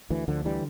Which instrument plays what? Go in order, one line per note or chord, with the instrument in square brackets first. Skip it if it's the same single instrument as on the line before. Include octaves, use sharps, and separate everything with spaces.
[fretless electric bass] D2 E3
D2 D3 F3
D3 E3 G3